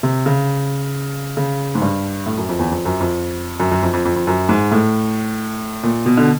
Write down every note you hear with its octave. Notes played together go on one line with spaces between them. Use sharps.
C3
C#3
C#3
G#2
G2
A2
F#2
F2
E2
F2
F#2
F2
F#2
F#2
F2
F2
F2
F2
F#2
G#2
A2
A#2
B2
D3